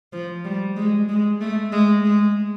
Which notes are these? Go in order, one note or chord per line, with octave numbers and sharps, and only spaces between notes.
F3
G3
G#3
G#3
A3
G#3
G#3